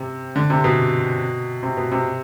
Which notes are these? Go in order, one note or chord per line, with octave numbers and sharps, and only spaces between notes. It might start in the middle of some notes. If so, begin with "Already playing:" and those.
Already playing: C3
D3
C3
B2
C3
B2
C3